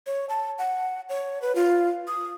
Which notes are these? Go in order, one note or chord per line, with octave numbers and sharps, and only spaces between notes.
C#5
A5
F#5
C#5
B4
F4
D#6